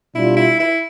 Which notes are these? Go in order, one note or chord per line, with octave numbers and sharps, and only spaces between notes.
B2 G3 D4 E4 F4
E4
E4